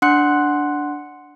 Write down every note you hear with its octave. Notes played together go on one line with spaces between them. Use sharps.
D4 F#5 C6 F#6 C#7